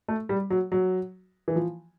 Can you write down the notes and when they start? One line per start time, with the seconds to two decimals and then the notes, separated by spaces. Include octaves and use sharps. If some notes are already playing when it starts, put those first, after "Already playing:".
0.08 A3
0.29 G3
0.50 F#3
0.72 F#3
1.48 E3
1.56 F3